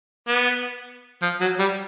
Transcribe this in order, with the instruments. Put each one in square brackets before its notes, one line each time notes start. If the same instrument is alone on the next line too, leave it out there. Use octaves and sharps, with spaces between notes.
[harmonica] B3
F3
F#3
G3